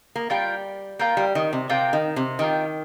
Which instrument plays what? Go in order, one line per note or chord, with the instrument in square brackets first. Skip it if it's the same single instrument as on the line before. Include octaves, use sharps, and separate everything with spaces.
[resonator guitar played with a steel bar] A#3
[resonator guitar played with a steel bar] G3 [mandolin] F4 A#4 G5
[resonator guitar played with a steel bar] A#3 [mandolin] F4 A#4 G5
[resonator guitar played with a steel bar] G3
D#3
C3
[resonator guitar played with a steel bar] C3 [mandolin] F4 A#4 G5
[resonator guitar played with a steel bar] D#3
C3
[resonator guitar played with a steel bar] D#3 [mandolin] F4 A#4 G5